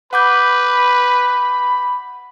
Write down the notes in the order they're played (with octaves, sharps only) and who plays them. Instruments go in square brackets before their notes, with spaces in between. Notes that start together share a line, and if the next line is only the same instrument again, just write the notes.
[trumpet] B4 [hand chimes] F#5 D6 G6 [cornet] B5